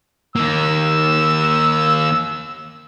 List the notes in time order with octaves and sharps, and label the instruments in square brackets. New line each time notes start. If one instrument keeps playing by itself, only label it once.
[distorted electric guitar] D#3 A#3 [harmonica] E6